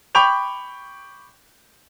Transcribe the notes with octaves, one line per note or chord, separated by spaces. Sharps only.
G5 B5 C#6 D6 G6 F7